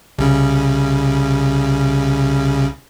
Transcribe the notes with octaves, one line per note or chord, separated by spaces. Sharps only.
C2 C#3